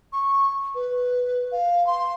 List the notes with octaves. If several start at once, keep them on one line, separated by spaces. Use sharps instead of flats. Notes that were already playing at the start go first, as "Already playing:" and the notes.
C#6
B4
F5
C6